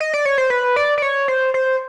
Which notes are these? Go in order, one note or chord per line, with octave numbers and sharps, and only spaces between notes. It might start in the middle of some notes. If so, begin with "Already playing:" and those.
D#5
D5
C#5
C5
B4
D5
D5
C#5
C5
C5